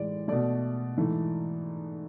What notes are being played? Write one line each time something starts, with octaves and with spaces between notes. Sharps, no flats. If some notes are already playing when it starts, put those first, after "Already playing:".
Already playing: A2 E3 G#3 D5
B2 A3 D5
G#2 E3 A3